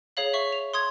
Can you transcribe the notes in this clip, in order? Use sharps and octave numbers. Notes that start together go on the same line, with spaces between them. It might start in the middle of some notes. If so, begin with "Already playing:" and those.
G#4 C#5 F5 F#7
E5 C#6
F7
C6 D#6 G#6